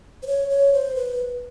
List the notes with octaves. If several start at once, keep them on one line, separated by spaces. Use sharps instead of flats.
C5
C#5
C#5
C5
B4